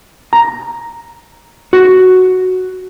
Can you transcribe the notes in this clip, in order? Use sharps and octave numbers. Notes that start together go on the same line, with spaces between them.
A#5
F#4